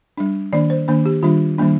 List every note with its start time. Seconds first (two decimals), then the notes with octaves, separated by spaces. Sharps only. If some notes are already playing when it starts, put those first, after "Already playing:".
0.18 G3 D4
0.53 D#3 A#3 D4 D5
0.70 C5
0.88 D#3 A#3 D4
1.05 G4
1.23 D#3 G3 D4 F4
1.58 D#3 G3 A#3 D4